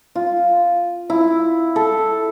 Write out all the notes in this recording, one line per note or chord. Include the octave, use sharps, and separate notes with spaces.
F4
E4
A4